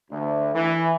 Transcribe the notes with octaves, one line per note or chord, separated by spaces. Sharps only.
D2
E3